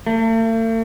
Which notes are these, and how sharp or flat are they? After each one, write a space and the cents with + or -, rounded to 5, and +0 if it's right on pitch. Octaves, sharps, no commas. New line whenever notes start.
A3 +45